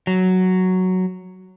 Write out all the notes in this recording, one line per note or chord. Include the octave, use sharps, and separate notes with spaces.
F#3